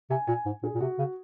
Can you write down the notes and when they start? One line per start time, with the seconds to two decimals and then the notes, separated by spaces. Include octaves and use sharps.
0.10 C3 G#5
0.27 A#2 G#5
0.46 G#2
0.63 A#2 G#4
0.74 A#2
0.80 C3 F#4
0.98 C#3